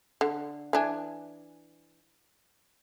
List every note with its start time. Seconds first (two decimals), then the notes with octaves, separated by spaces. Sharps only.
0.21 D3
0.73 E3 D4 G#5